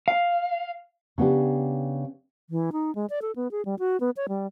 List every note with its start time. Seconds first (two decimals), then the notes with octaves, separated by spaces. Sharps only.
0.08 F5
1.18 C#3 B3 D4 G4
2.50 E3
2.72 D#4
2.95 G#3
3.10 D5
3.22 A4
3.36 B3
3.51 G#4
3.65 G3
3.79 F#4
4.00 B3
4.17 C#5
4.28 G3